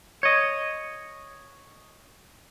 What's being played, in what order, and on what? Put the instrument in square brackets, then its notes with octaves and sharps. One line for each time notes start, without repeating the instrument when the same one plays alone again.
[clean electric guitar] C#5 D#5